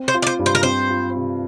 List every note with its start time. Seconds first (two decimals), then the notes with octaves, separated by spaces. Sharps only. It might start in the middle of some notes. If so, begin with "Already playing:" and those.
Already playing: C4
0.08 C5
0.14 F4
0.22 D5
0.27 C5
0.39 G2
0.46 C5
0.55 A#4
0.63 C4 C5
0.90 F4
1.16 C3